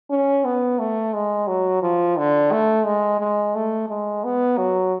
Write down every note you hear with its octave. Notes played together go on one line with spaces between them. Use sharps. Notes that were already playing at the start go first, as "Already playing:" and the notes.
C#4
B3
A3
G#3
F#3
F3
D3
A3
G#3
G#3
A3
G#3
B3
F#3